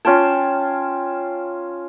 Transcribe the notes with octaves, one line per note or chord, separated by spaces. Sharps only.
C#4 F4 G5 A5